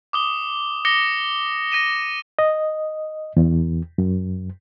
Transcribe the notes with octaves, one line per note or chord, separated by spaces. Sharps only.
D6 D#6 G7
D6 D#6 A#6 C#7 G7
A#6 D#7 E7
D#5
E2
F#2